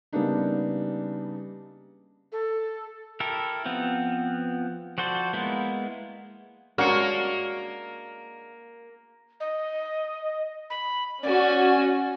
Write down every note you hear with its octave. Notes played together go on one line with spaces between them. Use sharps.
C#3 G3 A#3 B3 D4 D#4
A4
E4 G4 A4 A#4
F3 B3 C4
F3 F#4 A4 C5 D5
G#3 A#3 B3 E4
G#3 A#3 C#4 D4 F#4 F6 C#7
D#5
B5
C#4 F#4 D5 G#5